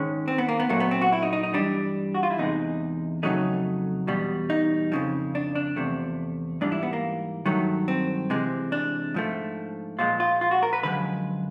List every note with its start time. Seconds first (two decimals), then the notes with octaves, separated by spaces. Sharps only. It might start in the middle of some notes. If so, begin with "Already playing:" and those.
Already playing: G#2 D#3 G#3 C#4
0.28 C4
0.38 B3
0.49 A#3
0.60 B3
0.69 A#2 F#3 A3 A#3
0.80 B3
0.91 C4
1.02 F#4
1.13 E4
1.23 D#4
1.33 D#4
1.43 D#4
1.54 G2 E3 G3 D4
2.15 F#4
2.23 F4
2.31 E4
2.38 E2 C3 E3 G#3 D#4
3.23 F2 C#3 F#3 A3 D#4
4.07 E2 B2 G3
4.50 D#4
4.92 F2 C#3 F3
5.35 D4
5.55 D4
5.76 E2 C3 F3 A3
6.61 G#2 E3 G3 D4
6.72 E4
6.83 B3
6.93 A#3
7.46 G2 D#3 F#3 A3
7.88 C4
8.30 C3 E3 G#3
8.72 D4
9.14 G#2 F3 A3
9.99 A#2 F3 G#3 F4
10.20 F4
10.41 F4
10.51 F#4
10.63 A#4
10.73 B4
10.83 F#2 D3 F3 G#3 B4